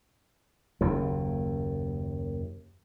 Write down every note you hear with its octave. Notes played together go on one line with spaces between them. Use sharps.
F#1 D#2